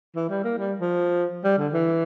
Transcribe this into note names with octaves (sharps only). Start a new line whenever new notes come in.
E3
G3
A#3
G3
F3
G3
D3
E3